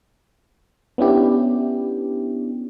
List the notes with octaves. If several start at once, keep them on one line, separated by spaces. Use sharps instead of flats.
B3 C#4 D4 E4 G4